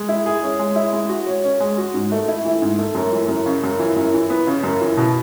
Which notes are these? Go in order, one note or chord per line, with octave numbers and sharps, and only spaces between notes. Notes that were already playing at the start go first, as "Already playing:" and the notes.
Already playing: G#3
E4
G#4
C#4
G#3
E4
G#3
F#4
C#5
C#4
G#3
F#4
G#2
A3
E4
E3
G#2
A3
F#2
E3
F#2
C#3
F#2
E3
F#2
E3
B3
C#3
F#2
E3
B2